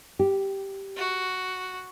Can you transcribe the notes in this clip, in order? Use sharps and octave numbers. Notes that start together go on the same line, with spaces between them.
G4
F#4